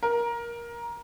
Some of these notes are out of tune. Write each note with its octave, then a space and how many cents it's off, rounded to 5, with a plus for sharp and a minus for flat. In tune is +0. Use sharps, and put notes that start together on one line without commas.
A#4 +15